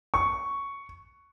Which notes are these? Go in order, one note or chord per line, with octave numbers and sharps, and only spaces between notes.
C#6